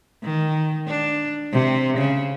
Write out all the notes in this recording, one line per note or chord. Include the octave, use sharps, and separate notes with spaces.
D#3
D4
C3
C#3